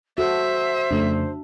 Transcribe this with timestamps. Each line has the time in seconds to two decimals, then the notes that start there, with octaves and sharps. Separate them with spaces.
0.18 F#4 A4 C5 E5
0.91 F2 C#3 A3 D4